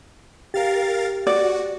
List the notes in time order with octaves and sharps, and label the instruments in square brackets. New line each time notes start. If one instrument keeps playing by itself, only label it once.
[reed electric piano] G4 [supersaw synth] A#4 F5 A6
[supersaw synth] F#4 [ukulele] D5